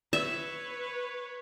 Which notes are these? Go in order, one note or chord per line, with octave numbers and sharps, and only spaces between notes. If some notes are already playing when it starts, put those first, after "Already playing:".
B4 C#5 E5